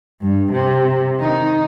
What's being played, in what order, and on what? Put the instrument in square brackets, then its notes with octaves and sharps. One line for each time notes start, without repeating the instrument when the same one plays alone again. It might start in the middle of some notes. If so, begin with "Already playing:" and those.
[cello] G2
C3
D#3 D#4